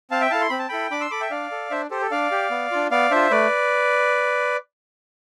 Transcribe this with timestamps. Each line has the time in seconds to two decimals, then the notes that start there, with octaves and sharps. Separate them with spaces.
0.11 C4 F5 A5
0.21 E5 G5
0.31 E4 A4 F5 A5
0.41 C6
0.50 C4 B5
0.59 A5
0.69 E4 A4 G5 B5
0.91 D4 B5 D6
1.01 C6 E6
1.11 A4 B5 D6
1.21 E5 G5
1.31 D4 D5 F5
1.51 A4
1.71 D4 C5 E5
1.91 G4 A4 C5
2.01 A4
2.11 D4 D5 F5
2.31 G4
2.51 B3
2.71 D4 F4
2.91 B3 D5 F5
3.11 D4 F4 C5 E5
3.31 A3 B4 D5